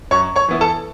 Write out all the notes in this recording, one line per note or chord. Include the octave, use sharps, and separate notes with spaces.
F#2 C#5 C#6
C#5 C#6
E3 B3 E4
A4 A5